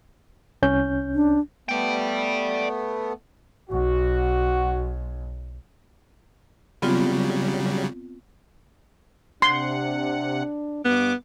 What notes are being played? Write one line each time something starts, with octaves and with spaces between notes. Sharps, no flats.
C2 C#4 G6
D4
A3 B3 D5 G5
B1 F#4
C#3 F#3 G3 B3 C4 F4
C3 D4 F#5 C6
G2 B3 D6